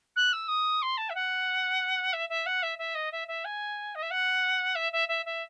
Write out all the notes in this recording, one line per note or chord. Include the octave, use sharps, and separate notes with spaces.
F#6
E6
D#6
C6
A5
E5
F#5
E5
E5
F#5
E5
E5
D#5
E5
E5
G#5
D#5
E5
F#5
E5
E5
E5
E5